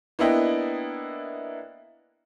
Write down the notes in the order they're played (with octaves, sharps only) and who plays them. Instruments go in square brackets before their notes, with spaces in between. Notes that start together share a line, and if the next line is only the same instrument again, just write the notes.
[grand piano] A#3 B3 D4 E4 D#5 G5